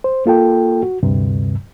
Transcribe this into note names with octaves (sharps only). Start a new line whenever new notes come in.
C5
A#3 F4 A4 G5
F#4
D2 G2 C3